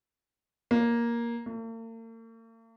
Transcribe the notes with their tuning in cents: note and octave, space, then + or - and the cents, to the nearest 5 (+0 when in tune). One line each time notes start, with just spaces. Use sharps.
A#3 +10
A#3 -45